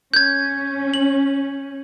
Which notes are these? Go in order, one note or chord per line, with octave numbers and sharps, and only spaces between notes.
C#4 G6 G#6
F#7